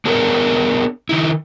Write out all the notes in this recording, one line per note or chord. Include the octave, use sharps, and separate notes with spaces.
B3 D4 G#4 A#4 C#5
D#3 D#4 E4